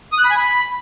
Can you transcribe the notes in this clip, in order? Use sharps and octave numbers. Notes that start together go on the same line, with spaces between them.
D#6
F#6
B5
G#5
B5